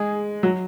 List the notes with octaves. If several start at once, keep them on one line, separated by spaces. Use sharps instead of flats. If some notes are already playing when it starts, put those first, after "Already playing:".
Already playing: G#3 G#4
F#3